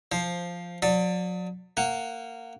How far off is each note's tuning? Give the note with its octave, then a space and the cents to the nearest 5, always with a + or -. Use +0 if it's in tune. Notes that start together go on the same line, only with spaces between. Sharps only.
F3 +0 C5 +10
F#3 -40 D5 +5
A#3 -20 F#5 +0